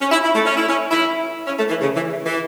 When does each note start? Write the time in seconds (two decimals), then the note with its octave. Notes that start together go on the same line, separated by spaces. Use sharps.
0.01 C#4
0.12 E4
0.23 E4
0.35 A3
0.45 C#4
0.57 E4
0.68 C#4
0.91 E4
1.47 C#4
1.58 A3
1.69 E3
1.81 C#3
1.95 E3
2.26 E3